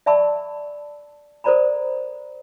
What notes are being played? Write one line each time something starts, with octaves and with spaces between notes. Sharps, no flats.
D5 E5 A5 B5 C#6 E6
A4 A#4 C5 D5 A#5 B5